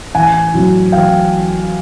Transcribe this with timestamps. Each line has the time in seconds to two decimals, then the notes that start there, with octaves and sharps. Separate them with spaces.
0.15 A1 F#5 G#5
0.54 A2 F#3
0.92 A1 F5 G5